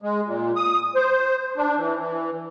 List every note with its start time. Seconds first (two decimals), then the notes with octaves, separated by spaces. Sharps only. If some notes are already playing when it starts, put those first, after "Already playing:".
0.02 G#3
0.27 A#2
0.56 D#6
0.95 C5
1.57 D4
1.77 E3
1.99 E3